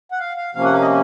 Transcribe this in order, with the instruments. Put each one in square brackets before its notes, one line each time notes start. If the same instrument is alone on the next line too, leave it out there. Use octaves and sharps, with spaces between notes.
[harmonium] F#5
F5
F5
C3 F3 A#3 C#4 F5
F#5
F5
D#5